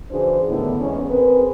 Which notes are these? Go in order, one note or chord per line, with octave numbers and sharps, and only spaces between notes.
C#3 E3 D4 F#4 G#4 C5
A2 D3 D#3 B3 D4 E4
E2 G#2 C#4
C4 G#4 A#4 B4